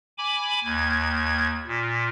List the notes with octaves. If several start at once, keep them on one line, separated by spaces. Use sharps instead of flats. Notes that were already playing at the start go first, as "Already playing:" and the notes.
G#5 B5 D6
D#2 G#6
A#2